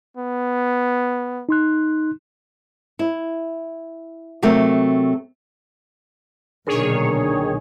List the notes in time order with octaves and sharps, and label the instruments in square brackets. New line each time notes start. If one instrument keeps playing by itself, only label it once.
[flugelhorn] B3
[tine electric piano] D#4 C6 F#6
[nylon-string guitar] E4
C3 F#3 A3 C4 A#4
[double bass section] B1 A#2 D3 [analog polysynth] D#3 G#4 C#5 [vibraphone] D4 A#4